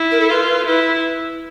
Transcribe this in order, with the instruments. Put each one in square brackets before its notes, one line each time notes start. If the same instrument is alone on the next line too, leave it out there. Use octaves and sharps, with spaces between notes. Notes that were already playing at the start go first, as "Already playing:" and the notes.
Already playing: [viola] E4
[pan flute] A#4
A4
[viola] F4 [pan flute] B4
[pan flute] B4
[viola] E4 [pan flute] B4